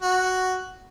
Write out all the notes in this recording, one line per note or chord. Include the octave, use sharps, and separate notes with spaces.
F#4